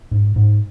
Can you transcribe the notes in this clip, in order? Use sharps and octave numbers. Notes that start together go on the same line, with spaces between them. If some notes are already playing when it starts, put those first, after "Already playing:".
G#2
G#2